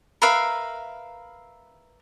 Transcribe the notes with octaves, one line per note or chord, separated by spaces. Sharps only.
A#4 B4 E5 F5